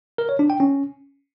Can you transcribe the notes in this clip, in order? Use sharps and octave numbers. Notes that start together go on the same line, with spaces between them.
A#4
C#5
D4
G5
C#4